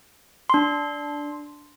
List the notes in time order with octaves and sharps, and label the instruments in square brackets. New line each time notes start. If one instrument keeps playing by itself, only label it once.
[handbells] D4 C6